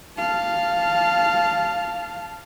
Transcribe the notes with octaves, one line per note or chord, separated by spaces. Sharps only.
F5 A5